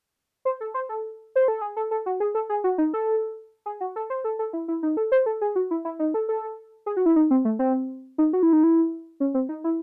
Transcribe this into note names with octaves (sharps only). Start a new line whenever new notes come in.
C5
A4
C5
A4
C5
A4
G#4
A4
A4
F#4
G#4
A4
G#4
F#4
D#4
A4
G#4
F#4
A4
C5
A4
A4
E4
E4
D#4
A4
C5
A4
G#4
F#4
E4
E4
D#4
A4
A4
G#4
F#4
E4
D#4
C4
A3
C4
D#4
F#4
E4
D#4
E4
C#4
C4
D#4
E4